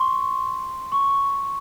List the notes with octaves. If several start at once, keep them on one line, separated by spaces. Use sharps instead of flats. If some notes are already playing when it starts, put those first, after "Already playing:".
Already playing: C6 C#6
C#6